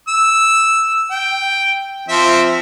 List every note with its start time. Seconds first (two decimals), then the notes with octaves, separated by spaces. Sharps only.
0.08 E6
1.11 G5
2.08 F3 C4 E5